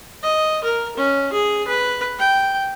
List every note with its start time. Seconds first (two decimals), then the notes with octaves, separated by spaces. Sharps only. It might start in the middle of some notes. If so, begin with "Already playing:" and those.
0.23 D#5
0.64 A#4
0.97 C#4
1.32 G#4
1.68 B4
2.19 G5